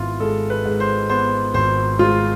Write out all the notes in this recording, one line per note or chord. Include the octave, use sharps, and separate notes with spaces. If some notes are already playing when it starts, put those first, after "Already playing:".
Already playing: G#1 B3 E4 F4
G#3 A4
B4
G#2
C5
B3 C5
G#1 C5
G#3 F4